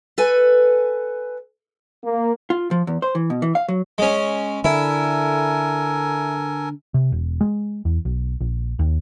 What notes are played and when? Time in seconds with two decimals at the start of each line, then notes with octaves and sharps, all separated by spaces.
0.18 A4 B4 G#5
2.04 A#3
2.50 F4
2.71 F3
2.87 E2
3.02 C5
3.15 E3
3.30 B2
3.42 E3
3.55 F5
3.69 F#3
3.98 G#3 C#4
4.64 D3 E4 A4 A#4 G#5
6.94 C3
7.12 E1
7.41 G#3
7.85 E2
8.05 B1
8.41 A#1
8.79 D#2